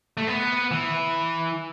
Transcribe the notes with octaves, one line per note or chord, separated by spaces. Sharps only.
A3
B3
E3